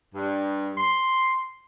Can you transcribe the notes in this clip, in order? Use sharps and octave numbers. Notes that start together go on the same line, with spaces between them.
G2
C6